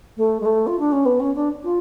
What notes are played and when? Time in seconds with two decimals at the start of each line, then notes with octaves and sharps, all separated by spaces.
0.16 A3
0.40 G#3
0.45 A3
0.66 F4
0.79 D4
0.92 C#4
1.05 B3
1.19 C#4
1.35 D4
1.63 F4